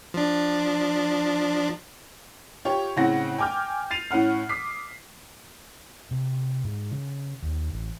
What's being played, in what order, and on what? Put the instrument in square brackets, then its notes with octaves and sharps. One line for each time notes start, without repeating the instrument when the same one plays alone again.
[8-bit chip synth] F3 D4
[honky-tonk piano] F4 G4 C#5
A2 C#3 C4 F#5 A#6
G5 G#5 D6 F6 G6
A6 C7 D#7 F7
A2 C#4 F#5 F6
D6 D#6 B6 C7
[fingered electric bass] C3
G#2
C#3
D#2
A1